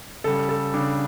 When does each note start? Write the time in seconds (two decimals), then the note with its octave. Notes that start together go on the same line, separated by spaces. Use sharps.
0.24 C#3 G3 A4
0.49 A4
0.74 C#3 G3 D4